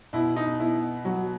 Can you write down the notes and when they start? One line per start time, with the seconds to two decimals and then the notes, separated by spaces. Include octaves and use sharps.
0.13 B2 E4
0.36 D#4
0.59 B3 E4
1.05 F#3 F#4